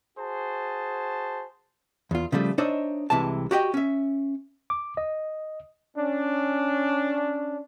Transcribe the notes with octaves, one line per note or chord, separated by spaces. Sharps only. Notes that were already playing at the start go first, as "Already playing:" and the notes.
F#4 G#4 C5 A5
E2 F4
C#3 F3 G3 A3
D4 D#4 C5 C#5 D#5 E5
C2 C3 E3 G#3 A5
F#4 G4 D#5 G5
C#4 E5
D6
D#5
C#4 D4